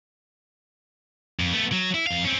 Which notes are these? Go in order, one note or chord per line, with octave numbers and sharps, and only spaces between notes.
F2
A3 B3
F#3
E4
F2 F5
C4 C#4